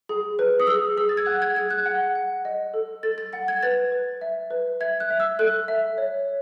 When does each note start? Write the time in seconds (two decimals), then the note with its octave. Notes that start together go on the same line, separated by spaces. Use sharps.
0.09 G#4
0.39 B4
0.60 D#6
0.67 G#4 E6
0.97 G#4 E6
1.09 A6
1.17 G#6
1.26 F#5 F#6
1.42 G#6
1.56 G#4 G#6
1.71 F#6
1.86 F#5
2.15 F#5
2.45 D#5
2.74 A4
3.03 A4 A6
3.18 A6
3.33 F#5 A6
3.48 G#6
3.63 B4 A6
3.92 B4
4.21 E5
4.51 B4
4.81 E5 G#6
5.00 F#6
5.10 E5
5.20 E6
5.39 A4 F#6
5.68 E5
5.98 C#5